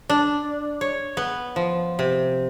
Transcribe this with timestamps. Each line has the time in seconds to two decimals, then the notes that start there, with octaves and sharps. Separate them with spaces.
0.09 D4
0.81 C#5
1.17 B3
1.56 F3
1.99 C3